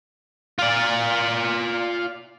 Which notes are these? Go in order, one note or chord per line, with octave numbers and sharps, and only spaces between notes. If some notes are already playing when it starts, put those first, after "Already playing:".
F4 D5